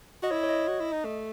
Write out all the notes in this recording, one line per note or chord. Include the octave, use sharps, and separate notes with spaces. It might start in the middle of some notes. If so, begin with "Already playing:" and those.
F#4 D#5
E4 C#5
C#5
D#5
F#4
E4
D#4
A3